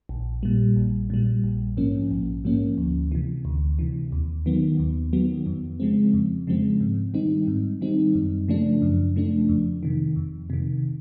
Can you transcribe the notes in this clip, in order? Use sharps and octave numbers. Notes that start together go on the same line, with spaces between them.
A#1
A#2 G3
A#1
A#2 G3
A#1
G#2 F3 A#3 C#4
A#1
G#2 F3 A#3 C#4
D2
C3 E3
D2
C3 E3
D#2
D#3 F#3 B3
D#2
D#3 F#3 B3
F2
C#3 F3 G#3 C4
F2
C#3 F3 G#3 C4
G#2
D#3 G3 C4 D#4
G#2
D#3 G3 C4 D#4
F#2
C#3 F3 A3 D4
F#2
C#3 F3 A3 D4
F2
C3 D#3
F2
C3 D#3